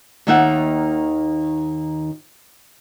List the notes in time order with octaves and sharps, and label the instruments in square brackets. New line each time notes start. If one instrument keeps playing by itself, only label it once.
[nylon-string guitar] D#2 D#3 A#3 D#4 E5 F#5